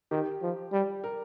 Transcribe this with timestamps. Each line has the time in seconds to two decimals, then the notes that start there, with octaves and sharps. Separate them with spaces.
0.11 D#3 G4
0.42 F3
0.72 G3
1.04 A#4